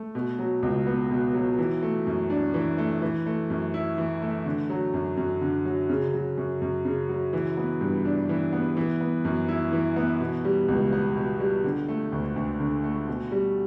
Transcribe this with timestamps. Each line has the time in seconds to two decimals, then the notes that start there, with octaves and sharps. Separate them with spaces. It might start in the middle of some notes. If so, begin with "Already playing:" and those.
Already playing: A3
0.15 B2
0.39 F#3
0.63 C#2
0.87 B3
1.11 B2
1.34 F#3
1.59 E3
1.82 A3
2.07 F#2
2.30 D4
2.54 E3
2.78 A3
3.02 E3
3.26 A3
3.50 F#2
3.74 E4
3.98 E3
4.22 A3
4.46 D3
4.70 F#3
4.94 F#2
5.17 F#2
5.41 D3
5.66 F#3
5.89 C#3
6.14 F#3
6.37 F#2
6.62 F#2
6.85 C#3
7.09 F#3
7.33 E3
7.57 B3
7.81 G2
8.05 D4
8.29 E3
8.53 B3
8.77 E3
9.01 B3
9.25 F#2
9.49 E4
9.72 E3
9.96 B3
10.21 B2
10.45 G3
10.68 C#2
10.92 B3
11.16 B2
11.40 G3
11.64 D3
11.88 A3
12.12 D2
12.36 D2
12.60 D3
12.84 A3
13.08 B2
13.32 G3